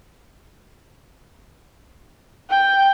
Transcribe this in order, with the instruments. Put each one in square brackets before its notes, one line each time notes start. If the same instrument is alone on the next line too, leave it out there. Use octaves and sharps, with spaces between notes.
[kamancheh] G5